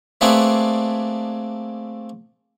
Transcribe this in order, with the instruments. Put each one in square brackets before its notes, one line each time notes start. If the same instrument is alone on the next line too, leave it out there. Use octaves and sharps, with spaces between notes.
[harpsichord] A3 A#3 C4 D4 G#4 B4